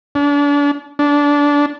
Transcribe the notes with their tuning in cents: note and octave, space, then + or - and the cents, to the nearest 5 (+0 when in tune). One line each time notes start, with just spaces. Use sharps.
D4 -35
D4 -20